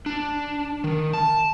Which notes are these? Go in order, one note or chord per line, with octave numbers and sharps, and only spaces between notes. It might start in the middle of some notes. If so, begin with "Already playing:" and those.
D4
D#3
A5